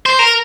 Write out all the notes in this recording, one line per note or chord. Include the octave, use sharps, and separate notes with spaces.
C5
A#4